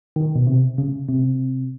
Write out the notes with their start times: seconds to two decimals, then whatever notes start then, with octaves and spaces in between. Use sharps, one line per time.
0.16 D#3
0.35 B2
0.47 C3
0.78 C#3
1.08 C3